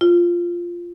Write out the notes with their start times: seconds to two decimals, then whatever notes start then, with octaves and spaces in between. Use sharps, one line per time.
0.01 F4